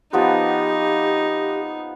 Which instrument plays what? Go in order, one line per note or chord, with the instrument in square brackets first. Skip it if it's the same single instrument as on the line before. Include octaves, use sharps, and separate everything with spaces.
[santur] F3 B3 B4 [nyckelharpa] D#4 [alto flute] G4